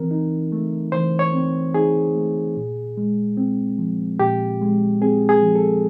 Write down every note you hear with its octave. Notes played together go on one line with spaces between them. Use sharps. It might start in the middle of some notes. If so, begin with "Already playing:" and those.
Already playing: E3 C4 A#4
D#4
A3
E3 C5
C#5
C4
D#4 G#4
A3
A#2
G#3
C4
F3
A#2 G4
G#3
C4 G#4
G#4
F3
A4